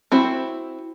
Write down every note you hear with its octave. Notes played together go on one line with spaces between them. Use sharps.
C4 E4 F#4 C5